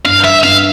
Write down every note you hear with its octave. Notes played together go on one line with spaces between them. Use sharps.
G2 F5
E5
G2 F5